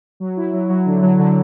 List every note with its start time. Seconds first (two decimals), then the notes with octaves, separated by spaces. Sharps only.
0.20 F#3
0.37 E4
0.53 F#3
0.69 F#3
0.86 D3
1.03 F#3
1.19 D3